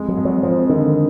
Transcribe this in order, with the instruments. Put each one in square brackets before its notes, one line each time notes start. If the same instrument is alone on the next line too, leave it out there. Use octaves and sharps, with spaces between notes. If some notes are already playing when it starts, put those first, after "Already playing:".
Already playing: [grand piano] F2 G#3
[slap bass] F#3
[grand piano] F2
[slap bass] F#3
[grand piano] F2 [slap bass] F3
[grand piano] D3 [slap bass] D#3